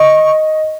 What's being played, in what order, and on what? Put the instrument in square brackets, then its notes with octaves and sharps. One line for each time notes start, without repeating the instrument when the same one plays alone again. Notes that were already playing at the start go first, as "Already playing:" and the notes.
Already playing: [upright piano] D#5 [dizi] C#6